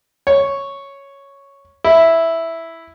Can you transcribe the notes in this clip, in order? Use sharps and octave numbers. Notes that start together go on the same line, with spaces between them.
C#5
E4